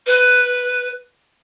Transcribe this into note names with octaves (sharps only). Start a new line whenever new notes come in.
B4